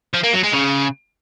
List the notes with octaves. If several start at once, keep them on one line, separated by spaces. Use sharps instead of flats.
F3
A#3
F#3
G#3
C#3